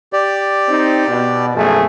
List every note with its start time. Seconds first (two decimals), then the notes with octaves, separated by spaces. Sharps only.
0.13 G4 D5
0.69 C4 D#4
1.08 B2
1.55 G#1 F#2 B2 F3 A3 G#4